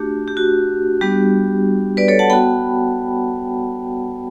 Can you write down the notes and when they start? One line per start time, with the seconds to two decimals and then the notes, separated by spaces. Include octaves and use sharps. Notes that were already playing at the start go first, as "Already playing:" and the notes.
Already playing: A3 D4 F#4 G4
0.28 G4
0.37 F#4
1.01 G3 B3 D4 F#4 G4
1.97 B4 D5
2.08 A4 C#5
2.19 F#5 A5
2.30 B3 F#4 G5 B5